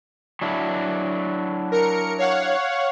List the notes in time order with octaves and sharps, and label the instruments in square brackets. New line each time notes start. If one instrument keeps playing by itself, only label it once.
[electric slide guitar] F#3 D4 E4
[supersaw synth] A#4 C#7
C#5 F5 F#5